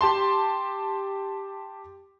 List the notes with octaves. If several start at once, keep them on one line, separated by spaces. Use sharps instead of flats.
G4 A5 C6